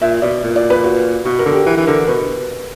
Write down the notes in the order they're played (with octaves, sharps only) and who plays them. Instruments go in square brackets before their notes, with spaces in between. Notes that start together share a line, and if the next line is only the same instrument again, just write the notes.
[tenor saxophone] A#2 [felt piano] E5
[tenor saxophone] B2 [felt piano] D5
[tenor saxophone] A#2
[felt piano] D5
B4
F#4
[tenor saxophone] B2 [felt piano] F#4
[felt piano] A#4
[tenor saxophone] D3
[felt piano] G4
[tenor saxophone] E3 [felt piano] A#4
[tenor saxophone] E3
[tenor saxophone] D3 [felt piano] A#4
[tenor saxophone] B2 [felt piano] B4